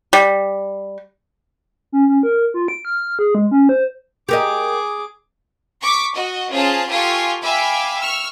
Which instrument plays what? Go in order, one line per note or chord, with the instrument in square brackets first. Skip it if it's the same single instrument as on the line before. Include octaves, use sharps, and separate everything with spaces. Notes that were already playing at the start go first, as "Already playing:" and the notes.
[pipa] G3
[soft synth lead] C#4
C#4
A#4
F4
D7
F6
G#4
G#3
C#4
C5
[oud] G4 A#4 D#5 [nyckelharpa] G#4 D6
[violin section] C#6 D6 B6
F#4 D#5
C#4 F4 G#4 C5 A5
F4 G4 A4 G#5 C6 C#6
E5 F5 G5 G#5 B5 D6
C#6 E6 F6